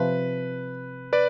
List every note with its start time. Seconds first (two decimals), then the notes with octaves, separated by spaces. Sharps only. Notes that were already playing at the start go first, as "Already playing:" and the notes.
Already playing: C3 F3 B4
1.13 B4 D5